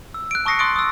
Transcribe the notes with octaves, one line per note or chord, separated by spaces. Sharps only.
E6
F#6 D7
A5 C#6 D#6 A#6 C7 C#7
C6 C#6 D#6 F#6 A6 D7
D#6 E6